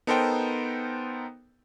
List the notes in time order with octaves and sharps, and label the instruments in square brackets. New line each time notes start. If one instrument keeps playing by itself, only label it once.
[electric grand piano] B3 D#4 A4 A#4 C5 G5